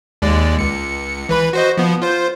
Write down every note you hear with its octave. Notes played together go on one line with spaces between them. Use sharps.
D#2 G#3 D5
C#2 C#7
E3 B4 B5
F#4 C5 D#5
F3 B3
F4 C5